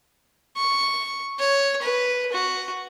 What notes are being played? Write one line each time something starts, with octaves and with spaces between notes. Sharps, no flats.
C#6
C#5
B4
F#4